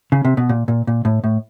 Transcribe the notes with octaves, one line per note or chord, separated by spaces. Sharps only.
C#3
C3
B2
A#2
A#2
A#2
A2
A2